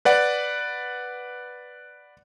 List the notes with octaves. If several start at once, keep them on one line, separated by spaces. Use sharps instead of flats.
B4 D5 F#5